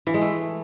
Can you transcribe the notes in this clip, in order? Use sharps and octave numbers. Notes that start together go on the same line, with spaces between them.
E3
G#3
A3